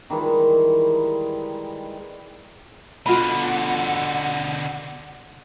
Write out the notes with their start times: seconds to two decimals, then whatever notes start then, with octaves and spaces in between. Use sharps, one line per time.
0.10 D#3 E3 G3 G#3
3.06 B2 D3 F4 F#5 B5